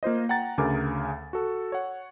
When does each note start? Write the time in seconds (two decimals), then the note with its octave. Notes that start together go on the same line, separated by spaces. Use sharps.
0.03 A#3 F4 C5 D#5
0.29 F#5 G5 A#5 A6
0.58 D2 C#3 A#4 G#5 D6
1.33 F#4 A4
1.72 C#5 F#5